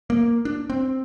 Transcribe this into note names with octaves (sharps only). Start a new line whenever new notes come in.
A#3
D4
C4